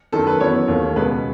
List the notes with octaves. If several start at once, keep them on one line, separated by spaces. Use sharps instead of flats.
F#2 D#3 A3 A4
B4
F#2 E3 B3 C#5
D#2 D#3 A3
C#2 B2 G#3 B3 B4